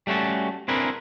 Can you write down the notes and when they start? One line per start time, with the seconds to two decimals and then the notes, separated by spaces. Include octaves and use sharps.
0.07 G3 A3 C#4 F#4 A4
0.68 C4 D4 E4 G#4 A#4 B4